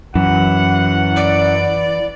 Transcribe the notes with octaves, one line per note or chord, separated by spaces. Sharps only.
F#2 E3 F#5
D5